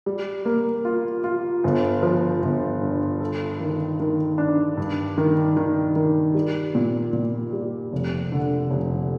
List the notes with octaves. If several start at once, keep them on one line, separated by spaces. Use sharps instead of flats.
G3
A#3
F4
F4
G1
F3
G1
G2
A4
D#3
D#3
D4
G2
D#3
D#3
D#3
G3
A#2
A#2
G3
F1
D3
F1